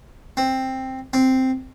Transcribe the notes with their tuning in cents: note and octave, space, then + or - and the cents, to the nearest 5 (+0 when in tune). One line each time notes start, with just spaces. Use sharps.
C4 +5
C4 -5